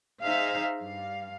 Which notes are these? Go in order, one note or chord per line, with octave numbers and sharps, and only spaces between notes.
D#4 G#4 C5 E5 F5
G2 F5